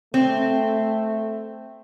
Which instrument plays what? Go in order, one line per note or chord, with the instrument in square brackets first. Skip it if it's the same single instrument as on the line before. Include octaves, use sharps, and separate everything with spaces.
[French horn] A3 [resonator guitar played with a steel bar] C4